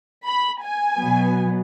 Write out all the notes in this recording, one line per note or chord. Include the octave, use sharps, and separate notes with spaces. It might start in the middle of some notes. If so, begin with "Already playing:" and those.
B5
G#5
B2 F#3 B3